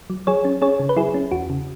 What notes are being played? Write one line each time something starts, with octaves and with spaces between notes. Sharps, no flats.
F#3
F#3 G#4 C#5
C#4
C#4 G#4 C#5
C#3
B4
F#3 E4 G#4
C#4
E2 F#4
C#3